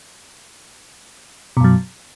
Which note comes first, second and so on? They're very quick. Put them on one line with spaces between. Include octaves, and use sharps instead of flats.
B2 F#2 F#3